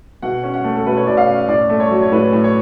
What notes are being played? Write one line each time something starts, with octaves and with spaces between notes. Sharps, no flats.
B2 F#5
C#4
F#5
A3
A4
B2 B4
C#5
B2 D5
F5
C#4
A2 D5
A3
C#5
F#3
C#5
A2 B4
A2
C#5